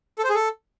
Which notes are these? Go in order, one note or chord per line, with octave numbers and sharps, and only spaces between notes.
A4
C5
G#4
A4